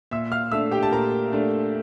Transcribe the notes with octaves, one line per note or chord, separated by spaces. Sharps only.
A#2 E5 E6
F5 F6
A3 D4 E5 E6
G4 G5
A5
A#2 A#4 A#5
A3 D4